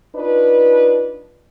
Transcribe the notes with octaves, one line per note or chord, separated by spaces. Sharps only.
D4 D#4 F4 B4